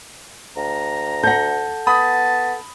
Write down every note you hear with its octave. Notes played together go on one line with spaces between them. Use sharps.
D2 A#5
A4 F#5 G6 A#6
B3 A5 B5 D#6